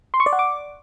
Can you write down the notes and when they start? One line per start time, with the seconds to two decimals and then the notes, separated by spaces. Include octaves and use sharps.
0.14 C6
0.20 C#6
0.26 D5
0.33 F#5
0.39 D6